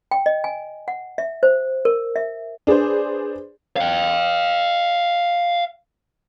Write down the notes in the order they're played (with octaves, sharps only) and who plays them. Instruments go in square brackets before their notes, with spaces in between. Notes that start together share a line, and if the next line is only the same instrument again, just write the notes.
[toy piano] G5
D#5
G#5
F#5
E5
C5
A#4
E5
[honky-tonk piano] D4 G#4 B4 C5
[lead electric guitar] F5 G5